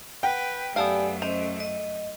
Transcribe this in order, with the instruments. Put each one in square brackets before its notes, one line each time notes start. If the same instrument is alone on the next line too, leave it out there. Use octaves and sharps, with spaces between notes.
[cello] B4 [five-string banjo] F#5 [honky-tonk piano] G5
[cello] F#2 A3 [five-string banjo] B3 A4 F5 [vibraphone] G4 D5 G#5
[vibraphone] C#4 D#5 [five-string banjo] C5
[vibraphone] D#5